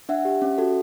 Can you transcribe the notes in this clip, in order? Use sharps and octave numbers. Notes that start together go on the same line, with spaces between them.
D4 E5 F#5
G4
C#4
F#4 A4